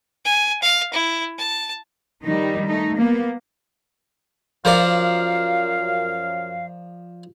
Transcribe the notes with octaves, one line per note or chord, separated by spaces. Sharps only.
G#5
F5
E4
A5
D#3 G3 D#4
A3 D#4
A#3 B3
F#2 F3 A#4 D5 F5